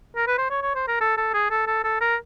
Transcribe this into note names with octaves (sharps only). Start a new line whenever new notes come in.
A#4
B4
C5
C#5
C#5
C5
A#4
A4
A4
G#4
A4
A4
A4
A#4